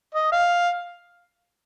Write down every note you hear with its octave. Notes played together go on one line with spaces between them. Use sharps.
D#5
F5